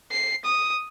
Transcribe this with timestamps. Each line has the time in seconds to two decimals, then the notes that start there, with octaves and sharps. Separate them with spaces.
0.12 C7
0.45 D#6